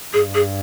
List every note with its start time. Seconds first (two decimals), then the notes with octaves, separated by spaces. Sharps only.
0.13 G2 G#4
0.35 G#4